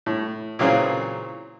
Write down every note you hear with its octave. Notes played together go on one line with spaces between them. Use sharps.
A2
A#2 C#3 E3 F#3 C4 G#4